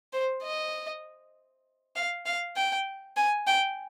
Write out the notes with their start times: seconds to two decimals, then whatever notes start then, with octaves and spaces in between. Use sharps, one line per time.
0.13 C5
0.43 D#5
1.95 F5
2.26 F5
2.57 G5
3.17 G#5
3.47 G5